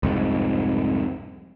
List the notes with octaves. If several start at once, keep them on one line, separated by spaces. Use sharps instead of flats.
C2 F2 G#2